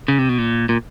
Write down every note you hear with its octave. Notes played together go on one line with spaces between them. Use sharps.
C#3
C3
B2
A#2
A#2